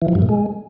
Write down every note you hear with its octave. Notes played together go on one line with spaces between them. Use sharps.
E3
F3
G2
A#2
G#3